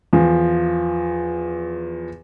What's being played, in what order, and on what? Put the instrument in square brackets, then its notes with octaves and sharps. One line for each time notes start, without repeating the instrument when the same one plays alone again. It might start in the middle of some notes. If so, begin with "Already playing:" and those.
[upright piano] E2 F3